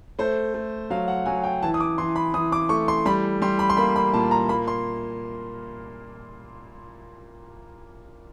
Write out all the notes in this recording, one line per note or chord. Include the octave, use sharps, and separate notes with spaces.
A3 C5
A3
F#3 F5
F#5
F#3 G#5
G5
E3 A5
D#6
D6
E3 C6
B5
E3 D#6
D6
A3 C#6
C6
G3 B5
G3 C6
B5
C6
A#3 B5
B5
A#2 A5
A#5
A#3 B5
C6